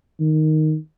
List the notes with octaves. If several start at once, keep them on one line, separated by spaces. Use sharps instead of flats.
D#3